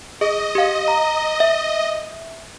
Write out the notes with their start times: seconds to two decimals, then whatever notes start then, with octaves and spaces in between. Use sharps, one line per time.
0.21 G#4 D#5
0.55 G4 F5
0.88 A#5
1.40 E5